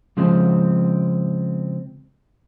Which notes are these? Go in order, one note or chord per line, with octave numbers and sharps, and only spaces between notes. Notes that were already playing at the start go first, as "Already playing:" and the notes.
C#3 F3 G#3 C4